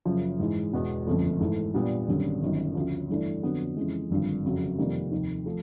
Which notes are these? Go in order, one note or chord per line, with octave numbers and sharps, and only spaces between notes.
F#1 F#2 C#3 F3
G#2 E3 G#3
E1 E2 B2 G#3 B3
G1 F2 C#3 F3 A3
G#2 E3 A3
A#2 G3 B3 D4
G#1 F#2 D3 G3
G1 F#2 D#3
D2 C#3 F3
G2 E3 A3 D4
F2 D3 F#3 B3
F2 C#3 E3 G#3
G#1 G2 D3 F3
F#1 F2 C#3 F#3
F2 C3 D#3 G3 A#3
F1 D#2 D#3
F3 A3